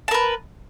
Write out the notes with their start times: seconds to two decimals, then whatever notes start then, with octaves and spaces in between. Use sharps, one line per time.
0.08 A5
0.11 A#4
0.14 B4